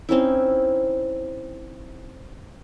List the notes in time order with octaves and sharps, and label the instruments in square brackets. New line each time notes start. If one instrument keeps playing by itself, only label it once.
[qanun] C4 C#4 D#4 E4